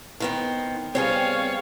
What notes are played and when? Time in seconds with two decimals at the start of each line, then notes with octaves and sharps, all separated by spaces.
0.20 D#3 B3 C4
0.95 G3 B3 C4 G#4 C#5 F5